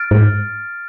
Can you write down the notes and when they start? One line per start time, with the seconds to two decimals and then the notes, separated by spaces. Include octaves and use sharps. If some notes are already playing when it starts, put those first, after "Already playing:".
Already playing: F6 A6 D7
0.11 G#2